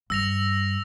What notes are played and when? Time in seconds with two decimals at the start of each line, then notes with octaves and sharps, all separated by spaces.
0.10 G2 E6 A#6 F7